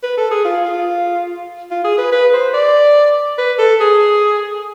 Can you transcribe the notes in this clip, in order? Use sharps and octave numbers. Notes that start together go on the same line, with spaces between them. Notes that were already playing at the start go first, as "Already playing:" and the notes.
B4
A4
G#4
F4
F4
F4
G#4
B4
B4
C5
D5
B4
A4
G#4